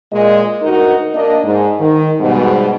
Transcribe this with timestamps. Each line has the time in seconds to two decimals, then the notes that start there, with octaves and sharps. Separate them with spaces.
0.13 A#2 G#3 D#5
0.62 D2 D#4 F#4 A#4
1.15 A#3 D4 D#5
1.44 G#2
1.80 D#3
2.20 G#2 B2 G3